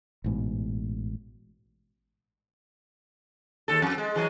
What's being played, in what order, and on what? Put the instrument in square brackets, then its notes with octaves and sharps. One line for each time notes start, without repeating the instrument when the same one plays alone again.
[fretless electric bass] A1 G#2 B2
[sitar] D#2 A4
F2
G#3
E3 F#3 G#3